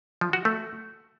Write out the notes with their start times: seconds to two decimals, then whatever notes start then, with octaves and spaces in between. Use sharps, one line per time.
0.21 F3
0.33 F#4
0.45 A3